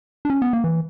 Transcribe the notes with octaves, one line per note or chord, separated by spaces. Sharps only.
D4
C#4
B3
A#3
E3